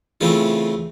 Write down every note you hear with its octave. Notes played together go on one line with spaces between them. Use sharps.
C#3 E3 A3 C4 F4